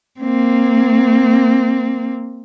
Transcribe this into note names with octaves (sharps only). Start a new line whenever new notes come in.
A#3 C4